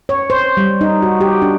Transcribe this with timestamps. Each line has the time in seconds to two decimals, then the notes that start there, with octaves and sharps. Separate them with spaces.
0.09 C#5
0.30 C5
0.57 G3
0.81 D#4
1.02 F#4
1.21 G4
1.42 D4